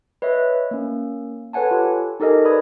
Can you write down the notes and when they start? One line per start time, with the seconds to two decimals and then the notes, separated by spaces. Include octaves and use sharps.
0.22 B4 C#5 D#5 E5
0.71 A#3 C#4
1.53 A4 B4 C#5 F#5 G#5 A5
1.71 F4 G4 A4
2.20 D#4 G4 A4 A#4 D#5 G#5
2.44 B4 D5 B5 D#6 G#6